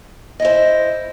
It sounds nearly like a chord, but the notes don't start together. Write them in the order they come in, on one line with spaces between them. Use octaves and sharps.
D#5 E4 C5